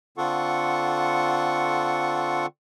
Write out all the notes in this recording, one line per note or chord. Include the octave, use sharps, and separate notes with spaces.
D3 C4 F4 A4 F#5 C#6